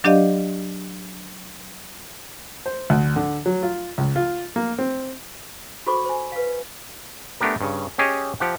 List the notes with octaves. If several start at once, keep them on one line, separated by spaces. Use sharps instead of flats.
F#3 D4 G4 D5 D#5 F5
C5
D2
D3
F#3
F4
C#2
F4
A#3
C4
F#4 A4 C5 B5 C#6 D6
C5 G#5
B4 F5
A3 B3 D4 G4 A#4
G2 C#3
C#4 G4 G#4 C#5 D#5
F3 G4 F#5